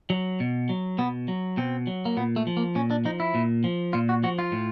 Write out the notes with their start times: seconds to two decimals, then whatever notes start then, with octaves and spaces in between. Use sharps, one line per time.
0.10 F#3
0.40 B2
0.69 F#3
0.98 B2 B3
1.28 F#3
1.57 B2 C4
1.87 F#3
2.05 A#3
2.17 A#2 B3
2.36 A3
2.47 F3
2.57 A#3
2.75 A#2 C#4
2.91 D4
3.05 F3 D#4
3.20 E4
3.35 A#2
3.64 F3
3.93 A#2 F4
4.09 F#4
4.23 F3 F#4
4.39 F4
4.52 A2